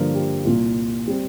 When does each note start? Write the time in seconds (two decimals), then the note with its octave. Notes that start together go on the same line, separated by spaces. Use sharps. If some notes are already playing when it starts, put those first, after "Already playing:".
Already playing: G2 D3 F3 A#3 A#4
0.15 G4
0.45 C2 A#2 A#3 F4
1.08 G3 C4